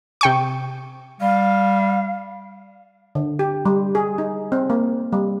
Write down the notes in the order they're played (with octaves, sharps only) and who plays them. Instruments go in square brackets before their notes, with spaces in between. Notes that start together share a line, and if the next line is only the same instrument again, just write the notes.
[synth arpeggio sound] C3 G5 C#6
[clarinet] G3 [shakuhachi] F5
[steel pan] D3
G4
G3
G#4
D#4
C4
A#3
G3